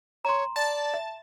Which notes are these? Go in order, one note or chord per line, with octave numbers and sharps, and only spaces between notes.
C#5 A#5 C6
D5 A5
E5